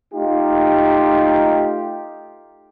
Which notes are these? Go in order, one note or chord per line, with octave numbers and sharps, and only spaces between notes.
A3 D#4 F4 G4